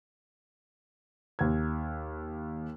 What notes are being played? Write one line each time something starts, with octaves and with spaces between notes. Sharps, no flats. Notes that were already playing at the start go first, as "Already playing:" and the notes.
D#2 G#6